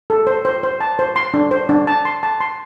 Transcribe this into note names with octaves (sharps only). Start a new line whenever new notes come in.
A4
C5
C5
C5
A5
C5
C6
D4
C5
D4
A5
C6
A5
C6